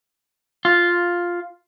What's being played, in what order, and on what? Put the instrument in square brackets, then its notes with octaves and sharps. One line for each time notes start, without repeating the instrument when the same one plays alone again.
[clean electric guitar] F4